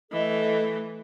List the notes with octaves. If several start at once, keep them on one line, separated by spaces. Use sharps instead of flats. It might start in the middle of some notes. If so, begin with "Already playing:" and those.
E3 A3 A4 D#5